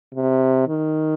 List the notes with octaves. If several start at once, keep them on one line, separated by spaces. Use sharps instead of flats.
C3
D#3